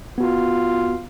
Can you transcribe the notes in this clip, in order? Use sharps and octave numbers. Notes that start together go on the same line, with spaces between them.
B3 F4 F#4